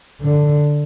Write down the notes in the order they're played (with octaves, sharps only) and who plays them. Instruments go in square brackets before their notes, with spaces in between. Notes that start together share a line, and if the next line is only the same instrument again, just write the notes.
[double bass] D3